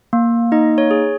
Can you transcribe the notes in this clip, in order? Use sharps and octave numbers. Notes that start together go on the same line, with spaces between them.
A#3
D#4 D#5
C#5
G#4